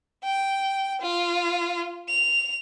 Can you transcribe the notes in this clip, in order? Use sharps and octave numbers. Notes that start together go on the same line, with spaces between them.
G5
F4
F7